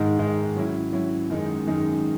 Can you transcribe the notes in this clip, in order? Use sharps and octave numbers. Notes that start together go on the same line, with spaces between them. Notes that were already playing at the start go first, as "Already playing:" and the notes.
Already playing: G#2 D#3 G#3
G#2 D#3 G#3
F#3 C#4 E4
F#3 C#4 E4
F#2 D#3 G#3 D#4
F#2 D#3 G#3 D#4